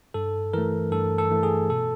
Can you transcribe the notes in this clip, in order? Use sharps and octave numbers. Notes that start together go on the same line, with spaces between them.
G2 A4
E3 A3 A#4
G2 A4
A4
E3 A3
G#4
B2 A4